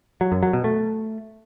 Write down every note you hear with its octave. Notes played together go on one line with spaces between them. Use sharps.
F#3
F#2
F#3
B2
A3